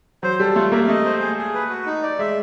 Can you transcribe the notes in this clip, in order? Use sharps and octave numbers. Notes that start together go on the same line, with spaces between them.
F#3 C5
G3 A4
A3 F4
A#3 E5
A3 D#5
C5
G#4
G#4
B4
F#4
D#4
D5
G#3 E5